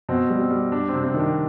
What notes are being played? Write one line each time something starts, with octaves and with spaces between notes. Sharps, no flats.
B2 C4
G3
C4
G3
G3 D4
C3 C4
C4
D#3
D4